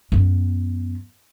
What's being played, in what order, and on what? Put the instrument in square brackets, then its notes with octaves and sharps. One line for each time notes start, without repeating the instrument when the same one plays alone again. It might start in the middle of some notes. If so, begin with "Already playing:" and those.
[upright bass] F#2 B3